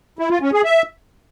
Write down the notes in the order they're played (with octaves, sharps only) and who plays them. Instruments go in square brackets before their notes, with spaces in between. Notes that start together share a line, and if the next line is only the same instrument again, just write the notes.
[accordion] E4
F4
C#4
G#4
E5